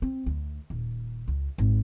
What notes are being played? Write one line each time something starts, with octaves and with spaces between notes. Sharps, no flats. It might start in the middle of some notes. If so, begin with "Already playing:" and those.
C4
D2
D#1
C#2
G#1